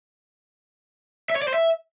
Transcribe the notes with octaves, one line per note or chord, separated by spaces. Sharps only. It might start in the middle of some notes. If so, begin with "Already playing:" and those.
E5
C#5
D5
C5
E5